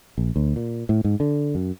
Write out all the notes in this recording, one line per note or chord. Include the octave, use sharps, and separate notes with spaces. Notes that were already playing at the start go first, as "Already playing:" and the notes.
A#1
D2
A#2
A2
G#2
D3
F#2